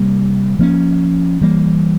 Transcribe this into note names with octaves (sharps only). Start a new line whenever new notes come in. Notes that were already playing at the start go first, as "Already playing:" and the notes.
Already playing: C3 G3 A#3
F3 A#3 C#4
E3 G3 A#3